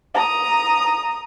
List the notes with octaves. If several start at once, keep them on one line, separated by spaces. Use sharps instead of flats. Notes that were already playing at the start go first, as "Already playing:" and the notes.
A#5 D#6